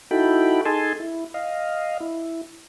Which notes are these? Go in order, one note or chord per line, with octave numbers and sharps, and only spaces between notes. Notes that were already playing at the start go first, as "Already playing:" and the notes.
D#4 E4 F#4 A4 G5 B5
D#4 G#4 A4 G#5 A5 C6
E4
D#5 F5
E4